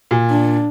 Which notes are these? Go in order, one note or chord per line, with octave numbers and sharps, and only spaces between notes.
A#2
D4